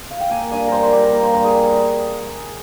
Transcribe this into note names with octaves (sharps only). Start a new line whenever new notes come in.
F5
G5
A#3 G#5
G2 G#5
G3 A#4 C5
C5
G2 G4
A#4
A#3 A#4
C5
G2 A#4
G#4
G3